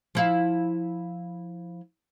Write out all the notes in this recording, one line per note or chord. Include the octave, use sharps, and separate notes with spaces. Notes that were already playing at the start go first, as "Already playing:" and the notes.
F3 E4 F5